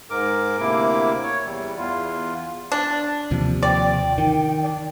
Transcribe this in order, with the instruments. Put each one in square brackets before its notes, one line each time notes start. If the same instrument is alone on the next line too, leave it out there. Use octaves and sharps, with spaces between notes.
[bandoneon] G#2 A#4 D6
D2 C3 A#3 E4 D6
C#5
E2 G3
E2 F4
[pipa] D4
[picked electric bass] D#2 C3 F3
[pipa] D5 [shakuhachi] G5
[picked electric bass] D#3
[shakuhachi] D5